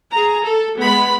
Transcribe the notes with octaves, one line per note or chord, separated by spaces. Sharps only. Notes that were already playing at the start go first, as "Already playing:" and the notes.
G#4 A#5
A4
G#3 B3 B5